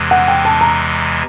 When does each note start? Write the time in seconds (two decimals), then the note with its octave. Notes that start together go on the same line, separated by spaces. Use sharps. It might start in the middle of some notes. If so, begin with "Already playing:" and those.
Already playing: E2 C3 E3 G#3
0.11 F#5
0.28 G5
0.45 A5
0.61 A#5